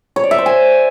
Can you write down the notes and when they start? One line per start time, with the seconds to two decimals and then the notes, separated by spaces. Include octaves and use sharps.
0.16 C#5
0.24 D5
0.31 E5
0.38 C5
0.46 G#5